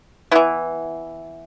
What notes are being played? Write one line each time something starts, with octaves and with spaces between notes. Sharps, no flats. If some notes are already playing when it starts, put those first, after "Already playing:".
E3 B3 E4